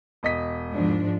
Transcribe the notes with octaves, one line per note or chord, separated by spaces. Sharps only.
E1 D#5 B6
G#2 F3 D4